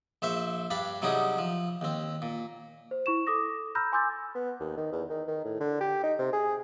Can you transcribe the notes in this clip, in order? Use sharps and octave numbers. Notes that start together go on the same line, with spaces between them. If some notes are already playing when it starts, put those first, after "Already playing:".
A#1 C5 E5 F5 C#6
G2 D4 F5 B5
C3 F#3 G3 C#4 D#4 G#4
F3
D#2 C4
A#2
C5
E4 C#6 E7
A4 D6 D#6 A#6
A#5 B5 E6 F6 G6 A#6
G#5 C6 D6 E6 G6 A6
B3
D#2
D#3
E2
D#3
D#3
A2
D3
G4
D#4
C3
G#4